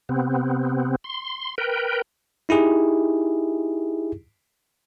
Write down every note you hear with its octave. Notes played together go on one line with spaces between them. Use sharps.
C3 B3 C4
C6
A#4 B4 G5
D#4 E4 G4 G#4